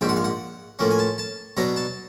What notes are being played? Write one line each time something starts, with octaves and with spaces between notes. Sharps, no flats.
A#1 G#2 F3 G5
F#5
F5
F#5
A2 F3 A#3 C#4
G#5
A5
A5
B2 F#3 B3 D4 A#5
A5